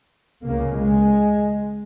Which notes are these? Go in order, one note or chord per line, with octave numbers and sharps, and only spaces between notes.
C#2 C#3 A#3
G#3